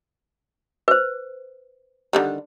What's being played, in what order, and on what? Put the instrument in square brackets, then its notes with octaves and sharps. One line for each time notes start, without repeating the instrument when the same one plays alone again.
[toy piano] B4 C5
[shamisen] D3 D#3 G3